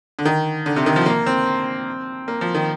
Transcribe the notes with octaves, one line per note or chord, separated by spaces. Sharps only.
D3
D#3
D3
C3
D#3
F3
A#3
C4
A#3
F3
D#3